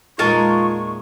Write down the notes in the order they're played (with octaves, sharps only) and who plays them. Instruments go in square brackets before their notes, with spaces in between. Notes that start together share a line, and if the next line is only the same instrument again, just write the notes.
[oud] E2 A#2 G#3 [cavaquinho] D#4 A#4 A5 [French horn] F4 [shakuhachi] C#6